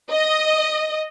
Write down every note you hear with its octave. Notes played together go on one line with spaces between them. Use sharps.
D#5